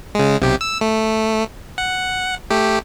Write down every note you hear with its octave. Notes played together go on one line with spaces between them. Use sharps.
C#3 G#3
B1 C3 G4
E6
A3
F#5
A3 G4